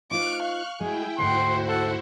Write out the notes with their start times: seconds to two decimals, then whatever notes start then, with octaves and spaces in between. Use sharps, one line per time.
0.11 D#4 F4 C5 C#6 D6 F6 F#6
0.42 F5
0.81 G#3 E4 F#4 G#4 G5
1.18 D2 G#2 E4 F#4 C5 F#5 G5 C6
1.68 A4 F#5